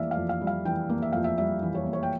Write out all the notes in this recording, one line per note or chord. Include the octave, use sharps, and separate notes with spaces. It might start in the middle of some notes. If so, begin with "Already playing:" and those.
Already playing: F2 E3 G3 A#3 D5 E5 F5
F5
F2
F5
G3
F5
E3 G5
A#3
E5
F2 F5
E5
G3 E5
E3
C#5
A#3
C#5
G5